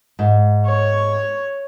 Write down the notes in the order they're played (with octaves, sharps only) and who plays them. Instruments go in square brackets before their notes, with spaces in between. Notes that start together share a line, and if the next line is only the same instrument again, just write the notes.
[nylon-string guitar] G#2
[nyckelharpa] C#5